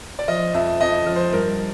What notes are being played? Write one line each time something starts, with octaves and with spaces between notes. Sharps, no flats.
D5
F3 D#5
F2 E5
F2 D#5
F3
C5
G2 A#4